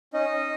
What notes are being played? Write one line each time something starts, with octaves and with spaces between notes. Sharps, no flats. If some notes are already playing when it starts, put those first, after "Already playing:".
C#4 D#4 D#5